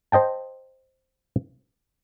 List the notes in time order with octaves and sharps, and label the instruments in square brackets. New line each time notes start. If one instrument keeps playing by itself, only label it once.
[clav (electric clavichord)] C5 D#5 G5 A5